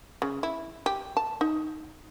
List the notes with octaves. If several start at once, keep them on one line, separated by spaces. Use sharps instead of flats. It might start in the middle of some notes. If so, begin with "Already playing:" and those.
C#3
E4
G4
A5
D#4